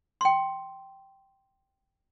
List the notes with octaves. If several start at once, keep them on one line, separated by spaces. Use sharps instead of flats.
G5 C6